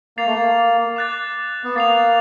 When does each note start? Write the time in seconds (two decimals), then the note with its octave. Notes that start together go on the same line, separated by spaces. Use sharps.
0.17 A#3 A6 C7 F7
0.26 A3
0.34 A#3
0.96 D6 F#6 A6
1.64 B3
1.75 A#3 A6 C7 F7